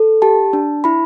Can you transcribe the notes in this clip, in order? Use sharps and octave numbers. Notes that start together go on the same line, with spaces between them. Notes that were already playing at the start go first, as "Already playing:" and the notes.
Already playing: A4
G4 A5
D4
E4 B5